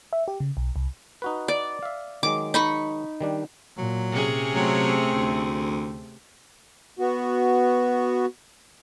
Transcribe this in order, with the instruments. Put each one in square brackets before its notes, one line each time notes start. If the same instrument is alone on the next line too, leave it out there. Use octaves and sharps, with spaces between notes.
[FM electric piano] E5
G4
C#3
B1
C2
[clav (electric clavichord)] D#4 F#4 B4
[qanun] D5
[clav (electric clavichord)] E5 F5
[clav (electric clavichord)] D#3 F#3 G#3 [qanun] D6
[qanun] D#4 B5 C#6
[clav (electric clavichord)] D#3 G3 D4
[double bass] A#2 [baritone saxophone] F#3
[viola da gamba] C3 C#4 G#4
[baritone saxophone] F#3 [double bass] A3 C4
[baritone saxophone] D2
[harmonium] B3 F#4